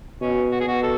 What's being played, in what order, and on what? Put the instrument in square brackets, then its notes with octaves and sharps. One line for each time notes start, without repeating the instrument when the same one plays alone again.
[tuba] B2 [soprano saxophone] C#4
[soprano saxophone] F#4
G#4
[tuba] B2 [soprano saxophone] F#4
[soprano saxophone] A4